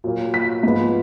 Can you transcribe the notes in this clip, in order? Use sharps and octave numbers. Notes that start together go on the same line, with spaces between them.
A#2 F#3 A#3
B6
G#2 F3 G#3 B3